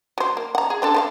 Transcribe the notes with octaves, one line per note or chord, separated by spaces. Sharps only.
F#3 C5
A#3
F#5 A#5
G#4
C4 D4 A4
A3 C5 F5